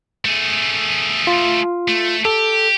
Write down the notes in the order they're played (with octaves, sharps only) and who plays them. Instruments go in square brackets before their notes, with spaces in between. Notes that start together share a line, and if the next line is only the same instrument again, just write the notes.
[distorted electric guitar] A3 G#4
[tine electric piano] F4
[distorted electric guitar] A3
[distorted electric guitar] G4 [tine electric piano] A4